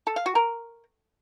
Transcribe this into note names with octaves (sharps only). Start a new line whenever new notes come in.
A4
F5
F#4
A#4